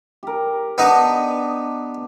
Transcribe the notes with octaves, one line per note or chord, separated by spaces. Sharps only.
G4 A#4
B3 D4 D#4 D#5